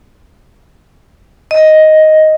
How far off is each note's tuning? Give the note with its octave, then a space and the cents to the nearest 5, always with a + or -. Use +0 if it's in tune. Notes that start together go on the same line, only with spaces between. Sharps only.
D#5 +5